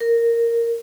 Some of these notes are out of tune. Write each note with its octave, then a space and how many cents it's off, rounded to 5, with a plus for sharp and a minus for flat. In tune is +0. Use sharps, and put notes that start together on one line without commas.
A#4 -5